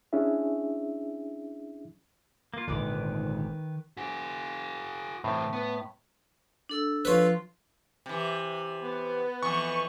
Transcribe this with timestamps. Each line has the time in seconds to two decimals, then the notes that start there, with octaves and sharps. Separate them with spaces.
0.13 C#4 D4 E4 G#4 E5
2.54 A#3 F4
2.67 G#1 A#2 D3 D#3 B4 D6
3.97 F#4 G#4
5.24 A2 C3 E3
5.53 B3
6.69 D4 A4 E6
7.05 F3 F4 B4 C#5
8.06 C3 E3
8.82 B3
9.42 F2 E3 C#6